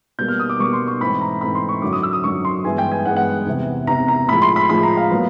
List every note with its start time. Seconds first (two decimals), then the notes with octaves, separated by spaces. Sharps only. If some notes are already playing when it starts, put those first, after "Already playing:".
0.19 B2 G3 A#3 G6
0.28 F6
0.40 D#6
0.50 D6
0.59 B2 G3 A#3 C#6
0.73 C6
0.87 C#6
1.00 G#2 E3 A3 C4 B5
1.21 A#5
1.41 G#2 E3 A3 C4 B5
1.55 C6
1.69 C#6
1.82 F#2 D3 F#3 D6
1.93 D#6
2.03 E6
2.13 D#6
2.24 F#2 D3 F#3 C#6
2.45 C6
2.64 G2 E3 G#3 B3 G#5
2.78 G5
2.91 G#5
3.06 G2 E3 G#3 B3 F#5
3.17 F#5
3.46 E2 C3 E3
3.87 E2 C3 E3 A#5
4.08 A#5
4.29 A2 F3 G#3 B5
4.42 C6
4.56 B5
4.70 A2 F3 G#3 B5
4.83 A#5
4.97 F5
5.11 A#2 F#3 B3